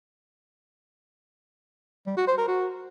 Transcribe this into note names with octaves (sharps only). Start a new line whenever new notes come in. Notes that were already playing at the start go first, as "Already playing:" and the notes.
G3
F#4
C5
A#4
F#4